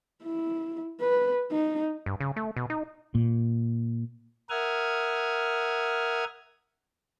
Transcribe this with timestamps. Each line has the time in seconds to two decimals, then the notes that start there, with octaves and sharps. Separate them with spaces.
0.23 E4
1.00 B4
1.51 D#4
2.06 G2
2.20 C#3
2.36 A3
2.56 B2
2.70 D#4
3.15 A#2
4.50 A#4 E5 F#5 D#6 F6 G#6